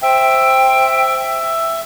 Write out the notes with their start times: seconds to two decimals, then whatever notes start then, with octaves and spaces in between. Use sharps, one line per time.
0.02 C5 E5 G5